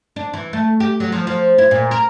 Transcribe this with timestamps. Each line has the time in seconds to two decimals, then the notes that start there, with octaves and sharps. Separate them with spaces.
0.16 D4
0.33 E3
0.53 A3
0.80 G4
1.00 F#3
1.12 F3
1.27 F3
1.58 E4
1.71 A#2
1.91 A#4